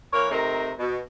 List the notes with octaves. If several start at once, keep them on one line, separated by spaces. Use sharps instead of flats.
E3 A#3 A#4 C#5
C3 A3 C4 D#4 A#4
B2